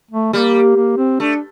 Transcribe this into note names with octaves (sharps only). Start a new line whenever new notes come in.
A3
G3 A#3
A#3
C4
A3 D4